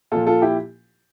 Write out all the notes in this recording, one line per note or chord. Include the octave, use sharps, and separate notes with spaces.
A#2 F3 F4 A4
F4 A4
E4 G4